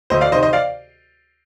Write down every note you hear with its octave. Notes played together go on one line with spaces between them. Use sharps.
D2 C5 D#5
D5 F5
C3 D#3 C5 D#5
C5 D#5
D5 F5